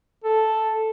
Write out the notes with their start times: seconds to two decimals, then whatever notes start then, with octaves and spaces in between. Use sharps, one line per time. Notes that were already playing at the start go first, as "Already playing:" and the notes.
0.24 A4